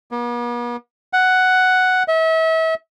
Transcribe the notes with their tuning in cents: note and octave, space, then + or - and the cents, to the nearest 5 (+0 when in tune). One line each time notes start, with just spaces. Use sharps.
B3 -45
F#5 +5
E5 -35